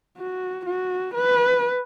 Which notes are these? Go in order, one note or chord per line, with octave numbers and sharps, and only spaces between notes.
F#4
F#4
B4